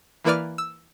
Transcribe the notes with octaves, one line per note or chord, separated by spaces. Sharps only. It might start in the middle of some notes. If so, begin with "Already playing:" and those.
E3 A#3 E4 B4 D5 F6
E6